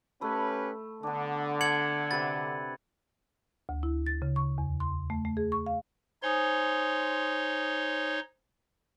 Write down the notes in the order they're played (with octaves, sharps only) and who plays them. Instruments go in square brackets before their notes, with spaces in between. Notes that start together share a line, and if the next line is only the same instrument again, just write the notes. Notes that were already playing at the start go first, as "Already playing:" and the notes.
[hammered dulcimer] A3 B5 [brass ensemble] C#4 G4 B4
[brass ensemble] D3 [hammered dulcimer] B3 D4
[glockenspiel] G#6 C#7 F#7
[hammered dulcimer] C3 B4 [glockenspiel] A6
[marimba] D2
E4
A6
C#3
C#6
E2
C6
A3
A3
G#4
C#6
F5
[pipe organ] D#4 C#5 C6 [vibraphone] C5 G#5 D#6